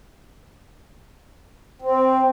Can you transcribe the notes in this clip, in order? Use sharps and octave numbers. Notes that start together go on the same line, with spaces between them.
C4